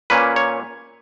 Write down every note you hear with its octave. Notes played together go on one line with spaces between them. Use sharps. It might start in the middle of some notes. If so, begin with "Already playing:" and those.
A#2 A#3 C#4 B4
C#5